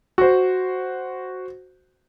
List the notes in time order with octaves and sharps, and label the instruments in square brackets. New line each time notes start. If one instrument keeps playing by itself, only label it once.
[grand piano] F#4 C5